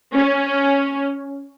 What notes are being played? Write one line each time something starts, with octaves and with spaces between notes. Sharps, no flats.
C#4